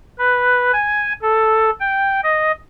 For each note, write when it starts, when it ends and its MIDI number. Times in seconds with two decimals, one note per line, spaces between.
0.19 0.72 71
0.73 1.13 80
1.22 1.70 69
1.80 2.21 79
2.23 2.52 75